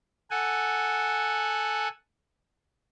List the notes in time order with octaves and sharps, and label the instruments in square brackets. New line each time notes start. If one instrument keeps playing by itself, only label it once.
[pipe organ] A4 F#5 G#5